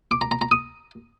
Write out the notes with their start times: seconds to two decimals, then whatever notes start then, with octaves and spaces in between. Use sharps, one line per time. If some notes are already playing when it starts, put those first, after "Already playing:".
0.11 D6
0.21 A#5
0.31 A#5
0.41 A#5
0.51 D#6